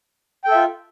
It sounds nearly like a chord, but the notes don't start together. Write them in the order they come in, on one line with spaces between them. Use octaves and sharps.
G5 A4 E5 F4